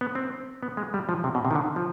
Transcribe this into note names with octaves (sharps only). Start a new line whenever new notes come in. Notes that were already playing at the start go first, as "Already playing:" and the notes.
B3
C4
B3
G#3
G3
F3
C3
B2
C3
D#3
D3
F3